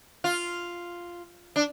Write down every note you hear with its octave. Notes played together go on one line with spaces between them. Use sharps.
F4
D4